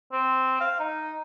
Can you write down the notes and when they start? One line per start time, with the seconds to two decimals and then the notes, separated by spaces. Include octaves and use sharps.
0.12 C4
0.61 F5
0.80 D#4